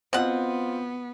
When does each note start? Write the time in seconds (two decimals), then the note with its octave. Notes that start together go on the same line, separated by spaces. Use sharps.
0.13 B2 B3 C4 F4 F#5